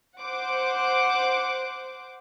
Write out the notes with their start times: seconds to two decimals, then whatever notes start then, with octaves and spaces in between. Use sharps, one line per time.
0.20 C5 F#5 D6